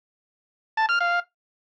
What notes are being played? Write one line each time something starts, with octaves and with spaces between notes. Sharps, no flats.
A5
F6
F5